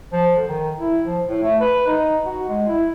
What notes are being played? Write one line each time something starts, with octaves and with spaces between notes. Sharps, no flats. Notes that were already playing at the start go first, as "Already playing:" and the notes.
F3
D3
D#3
E4
F3
A2
A3
B4
D#4
F#4
G#3
E4